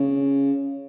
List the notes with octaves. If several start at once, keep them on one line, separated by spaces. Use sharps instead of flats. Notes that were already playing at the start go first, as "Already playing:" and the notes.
Already playing: C#3